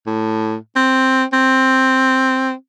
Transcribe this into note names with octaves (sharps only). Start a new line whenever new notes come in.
A2
C4
C4